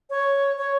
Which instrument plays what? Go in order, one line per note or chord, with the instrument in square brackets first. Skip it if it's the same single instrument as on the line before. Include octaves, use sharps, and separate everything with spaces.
[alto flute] C#5
C#5